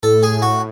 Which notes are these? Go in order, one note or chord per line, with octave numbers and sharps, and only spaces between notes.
A2 A4
G#4
F#4